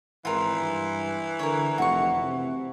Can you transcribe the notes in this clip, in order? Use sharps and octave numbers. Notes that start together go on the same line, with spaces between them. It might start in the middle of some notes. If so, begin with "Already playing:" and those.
G#1 E3 F4 A#4
G2
D3 A#4 C#5
F1 F#4 C#6
C3